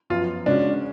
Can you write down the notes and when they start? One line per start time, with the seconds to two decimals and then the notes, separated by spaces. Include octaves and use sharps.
0.10 F#2 F3 B3 F4
0.46 C#3 G#3 C#4 D4 F#4